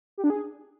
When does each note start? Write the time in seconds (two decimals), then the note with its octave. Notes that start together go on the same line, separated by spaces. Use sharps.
0.18 G4
0.24 D4
0.30 G#4